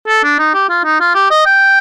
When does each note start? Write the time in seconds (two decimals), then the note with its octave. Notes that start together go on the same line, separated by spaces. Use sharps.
0.08 A4
0.24 D4
0.39 D#4
0.55 G4
0.70 F4
0.85 D#4
1.00 F4
1.15 G4
1.31 D#5
1.46 G5